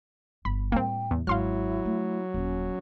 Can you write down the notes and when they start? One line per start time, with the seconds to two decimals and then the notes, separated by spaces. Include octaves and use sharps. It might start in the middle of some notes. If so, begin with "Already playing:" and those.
0.45 G1 B5
0.72 A2 G3 A#3 C4 G5
1.11 E2
1.27 G#1 F#3 E4 F5 C6 F6
1.85 A3
2.34 D#1 C#4